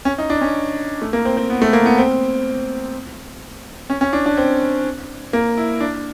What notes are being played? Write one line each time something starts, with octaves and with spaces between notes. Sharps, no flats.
C#4
D#4
D4
C#4
A3
A#3
C4
C4
B3
A3
A#3
B3
C4
C#4
C#4
D4
D4
C4
A#3
E4
D4